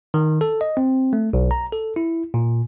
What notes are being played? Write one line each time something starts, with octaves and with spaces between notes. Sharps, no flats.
D#3
A4
D#5
C4
A3
B1
A#5
A4
E4
A#2